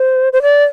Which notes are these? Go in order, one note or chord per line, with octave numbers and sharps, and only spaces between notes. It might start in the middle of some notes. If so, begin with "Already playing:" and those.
Already playing: C5
C5
D5